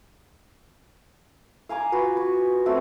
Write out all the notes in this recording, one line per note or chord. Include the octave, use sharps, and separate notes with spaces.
F5 G#5 A#5 D6
F4 F#4 B4
C#6
A3 C4 F#4